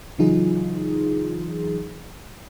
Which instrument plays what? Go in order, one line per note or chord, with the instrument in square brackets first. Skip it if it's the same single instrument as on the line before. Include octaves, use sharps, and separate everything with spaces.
[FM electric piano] C#3 E3 F#3 D#4 F4 G#4